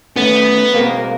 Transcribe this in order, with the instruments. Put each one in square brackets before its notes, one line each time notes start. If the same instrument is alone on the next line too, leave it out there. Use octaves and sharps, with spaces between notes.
[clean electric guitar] D#3 A3 C#4 [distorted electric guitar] B3
[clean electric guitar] B2 G#3 C4 [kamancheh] A#3